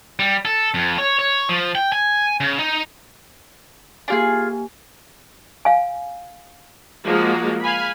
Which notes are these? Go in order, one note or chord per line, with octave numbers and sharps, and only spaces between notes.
G3
A4
F2
C#5
C#5
F3
G5
G#5
C#3
D#4
A#3 D4 F4 G4 G#4 G#5
F5 G#5
F3 G#3 A#3 F#4
F5 G#5 B5